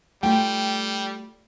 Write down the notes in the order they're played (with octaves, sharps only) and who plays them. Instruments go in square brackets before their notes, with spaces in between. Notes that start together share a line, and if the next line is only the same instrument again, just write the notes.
[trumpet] G3 [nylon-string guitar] A3 F4 [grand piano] G5